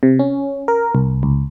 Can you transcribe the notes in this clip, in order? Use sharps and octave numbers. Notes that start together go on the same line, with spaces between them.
C3
C#4
A#4
C2
C#2